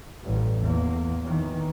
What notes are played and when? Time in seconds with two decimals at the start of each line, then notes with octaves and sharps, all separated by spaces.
0.23 A1 G2
0.59 E2 A#3
1.24 D#3 E3